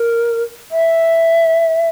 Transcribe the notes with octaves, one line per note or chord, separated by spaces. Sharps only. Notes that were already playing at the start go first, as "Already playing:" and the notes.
Already playing: A#4
E5